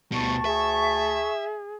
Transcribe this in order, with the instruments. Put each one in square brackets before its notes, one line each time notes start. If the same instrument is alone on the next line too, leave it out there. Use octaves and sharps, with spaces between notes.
[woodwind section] D2 A5 C#6 [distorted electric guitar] B2 G3
[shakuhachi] G#4 [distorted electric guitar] E5